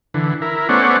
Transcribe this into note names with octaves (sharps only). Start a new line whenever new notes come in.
D3 E3
E4 A#4
A3 B3 C#4 C5 D5 F#5